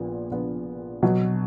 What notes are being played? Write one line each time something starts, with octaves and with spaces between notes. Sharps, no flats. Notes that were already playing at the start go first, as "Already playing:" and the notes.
Already playing: A#1 A#2 B3 F4
A#1 A#2 F3 B3 F4
B2 F#3 B3